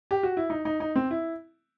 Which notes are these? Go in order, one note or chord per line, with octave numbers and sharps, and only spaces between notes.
G4
F#4
E4
D#4
D#4
D#4
C4
E4